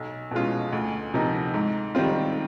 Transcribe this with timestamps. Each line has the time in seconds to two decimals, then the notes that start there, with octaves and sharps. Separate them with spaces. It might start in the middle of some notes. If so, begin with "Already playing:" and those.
Already playing: B1
0.31 B2 G#3 C#4 F4
0.73 D2
1.14 C3 F3 A#3 D#4
1.54 G#2
1.95 D#3 G3 C4 F4